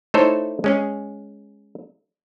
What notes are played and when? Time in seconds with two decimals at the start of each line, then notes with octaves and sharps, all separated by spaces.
0.14 A3 D#4 E4 A4 C5 C#5
0.64 G#3 C#4 G#4